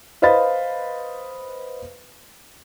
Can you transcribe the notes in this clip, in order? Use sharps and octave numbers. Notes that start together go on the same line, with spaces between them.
B4 C5 D#5 F5 B5 A6